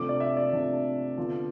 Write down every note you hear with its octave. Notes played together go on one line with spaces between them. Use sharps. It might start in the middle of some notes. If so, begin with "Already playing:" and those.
Already playing: C3 F3 A3 D4 D6
D5
E5
D5
C3 F3 A3 D4
D3 F3 B3 D4 F4